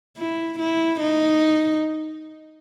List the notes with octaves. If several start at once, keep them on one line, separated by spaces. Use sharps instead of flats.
E4
E4
D#4